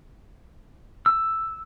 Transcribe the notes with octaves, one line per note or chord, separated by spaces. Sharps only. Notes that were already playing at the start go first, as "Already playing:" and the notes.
E6